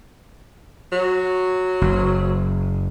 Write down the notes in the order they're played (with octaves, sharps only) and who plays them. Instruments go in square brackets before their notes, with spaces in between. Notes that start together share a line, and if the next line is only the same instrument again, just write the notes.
[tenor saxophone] F#3
[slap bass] F#1